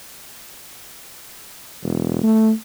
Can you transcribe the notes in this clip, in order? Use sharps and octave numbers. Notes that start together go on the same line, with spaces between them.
E1
A3